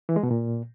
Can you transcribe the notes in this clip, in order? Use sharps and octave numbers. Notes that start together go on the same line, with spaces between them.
E3
G#3
B2
A#2